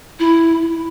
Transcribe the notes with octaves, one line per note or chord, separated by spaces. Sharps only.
E4